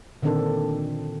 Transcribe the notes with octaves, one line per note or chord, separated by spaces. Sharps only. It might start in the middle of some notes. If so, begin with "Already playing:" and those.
A#2 D3 D#3 C4 D4 A4